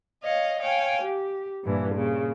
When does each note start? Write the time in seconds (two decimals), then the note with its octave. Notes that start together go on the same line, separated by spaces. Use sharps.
0.23 C#5 D#5 F5
0.60 C#5 F5 G5 G#5
1.02 G4
1.63 G2 A#2 E3
1.94 A#2 C#3